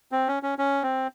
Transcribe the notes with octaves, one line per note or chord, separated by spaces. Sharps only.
C4
C#4
C#4
C#4
C4